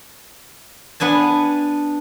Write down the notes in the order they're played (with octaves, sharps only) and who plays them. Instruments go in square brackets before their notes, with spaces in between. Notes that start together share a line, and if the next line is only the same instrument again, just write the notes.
[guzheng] B3 D4 G#5 A5